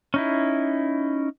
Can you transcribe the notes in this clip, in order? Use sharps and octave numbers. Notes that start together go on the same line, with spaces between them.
C#4 D#4 E4